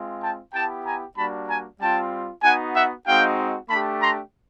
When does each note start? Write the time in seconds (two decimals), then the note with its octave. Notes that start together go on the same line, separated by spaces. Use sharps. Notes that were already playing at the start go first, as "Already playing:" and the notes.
Already playing: G#3 C4 F4
0.22 G5 A5
0.54 B3 E4 G4 G5 A5
0.85 G#5 A#5
1.17 G3 A#3 D4 F#4 A5 B5
1.49 G#5 A#5
1.80 G3 C4 F4 G5 A5
2.43 B3 D#4 F#4 F#5 G#5
2.75 E5 F#5
3.06 G#3 C4 D#4 F#4 F5 G5
3.70 A3 D4 G4 A5 B5
4.01 A#5 C6